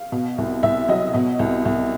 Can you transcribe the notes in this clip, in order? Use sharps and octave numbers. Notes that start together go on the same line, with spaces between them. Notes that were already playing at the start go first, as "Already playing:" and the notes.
Already playing: F5
B2
C2
C2 E5
F#3 D#5
B2 D#5
C2
C2